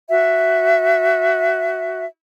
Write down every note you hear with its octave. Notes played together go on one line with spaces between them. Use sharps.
F#4 E5